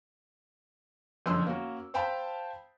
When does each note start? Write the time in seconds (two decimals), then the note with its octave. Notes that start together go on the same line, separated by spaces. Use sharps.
1.26 F#1 F2 D3 C#4 C6 E6
1.46 A#3 C#4 F#4
1.94 C5 F5 G5 A5 B5